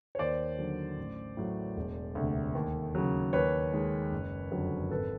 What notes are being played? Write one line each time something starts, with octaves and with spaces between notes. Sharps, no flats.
C#5
D#2 C5 D5
D3 F#3
A1
A2 F#3
E1
D2 C3
D#2
C#3 F#3
D#2 B4 C#5
D#3 G#3
F#1
F2 D3 F#3
G#1 A4 B4